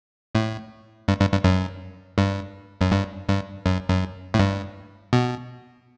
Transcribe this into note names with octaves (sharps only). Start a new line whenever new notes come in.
A2
G2
G2
G2
F#2
G2
F#2
G2
G2
F#2
F#2
A2
G2
B2